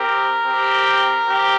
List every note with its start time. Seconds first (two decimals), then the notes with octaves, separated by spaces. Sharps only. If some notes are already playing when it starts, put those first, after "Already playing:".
Already playing: C4 G4 A#4
0.44 C4 G4
1.26 C4 G4